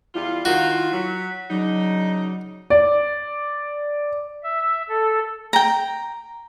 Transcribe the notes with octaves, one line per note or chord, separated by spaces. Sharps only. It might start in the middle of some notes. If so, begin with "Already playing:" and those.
E2 G3 E4 F4
D#3 F4 F#4
F#3 B6
C#3 F#3 D4 D#4
D5
E5
A4
G5 A#5